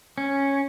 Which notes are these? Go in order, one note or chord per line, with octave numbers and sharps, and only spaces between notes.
C#4